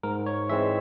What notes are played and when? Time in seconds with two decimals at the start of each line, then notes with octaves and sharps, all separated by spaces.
0.03 G#2 A#4
0.26 C#5
0.49 E3 G#3 C4 E5